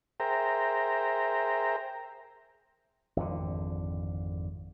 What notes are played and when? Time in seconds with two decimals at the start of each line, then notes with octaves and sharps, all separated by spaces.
0.20 G#4 A#4 C5 E5 G5 A#5
3.17 G#1 F2 D3